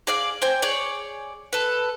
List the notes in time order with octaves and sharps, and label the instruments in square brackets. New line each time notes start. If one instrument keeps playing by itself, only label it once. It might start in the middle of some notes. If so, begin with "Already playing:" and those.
[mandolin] G#4 D5 F5
C5 G5 G#5
G#4 C#5 D5
A4 B4